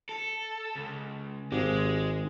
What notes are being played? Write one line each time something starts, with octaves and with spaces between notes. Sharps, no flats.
A4
C#2
G#1 G#3 G4